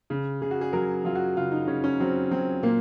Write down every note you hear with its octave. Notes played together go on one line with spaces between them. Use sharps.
C#3
C#3 G#4
F#4
G#4
F#3 A#4
F#3 F4
F#4
C#3 F4
D#4
C#3 C#4
C#4
F#3 C4
F#3 C4
A#2 A#3